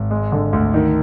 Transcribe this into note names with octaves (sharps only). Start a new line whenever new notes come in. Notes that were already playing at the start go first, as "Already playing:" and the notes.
Already playing: G#1
G#3
D3
D2
D#3